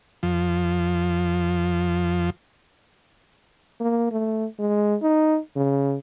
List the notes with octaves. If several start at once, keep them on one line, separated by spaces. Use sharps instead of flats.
F2 F3
A#3
A3
G#3
D#4
C#3